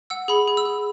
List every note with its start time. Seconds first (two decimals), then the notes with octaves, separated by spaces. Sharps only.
0.10 F#5 E6
0.28 G#4 B5
0.48 G#4
0.57 E6
0.65 G#4